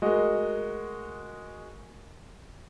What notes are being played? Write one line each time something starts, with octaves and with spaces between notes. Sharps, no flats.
G#3 A3 F#4 A#4 D#5